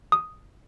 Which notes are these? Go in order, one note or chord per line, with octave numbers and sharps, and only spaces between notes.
D#6